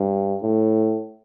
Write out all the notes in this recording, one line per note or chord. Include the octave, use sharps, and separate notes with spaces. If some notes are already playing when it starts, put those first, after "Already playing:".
Already playing: G2
A2